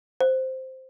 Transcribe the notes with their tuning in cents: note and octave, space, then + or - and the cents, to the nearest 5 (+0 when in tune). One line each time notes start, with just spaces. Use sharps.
C5 -5